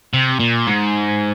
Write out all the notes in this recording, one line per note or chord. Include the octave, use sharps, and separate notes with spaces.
C3
A#2
G#2